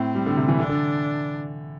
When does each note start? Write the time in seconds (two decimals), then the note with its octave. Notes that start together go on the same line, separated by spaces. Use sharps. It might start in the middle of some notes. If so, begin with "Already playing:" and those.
Already playing: A2 C4
0.15 G3
0.26 D3
0.37 C3
0.48 E3
0.59 D3 D4
0.69 D3